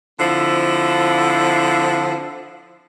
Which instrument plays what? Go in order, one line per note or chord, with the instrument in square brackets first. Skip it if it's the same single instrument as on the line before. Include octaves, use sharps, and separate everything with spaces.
[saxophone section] D3 F3 C4 E4